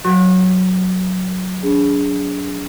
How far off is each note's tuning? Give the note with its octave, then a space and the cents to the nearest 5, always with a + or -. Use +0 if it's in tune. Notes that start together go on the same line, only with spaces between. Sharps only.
F#3 +0 F#4 +0 C#6 -40
D4 -35 G#4 -5